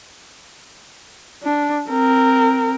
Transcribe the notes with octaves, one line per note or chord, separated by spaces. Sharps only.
D4
C4 A#4